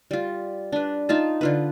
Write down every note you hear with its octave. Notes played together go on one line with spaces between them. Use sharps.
G3 F4
D4 B4
D#4 F4 A5
D3 F4 B4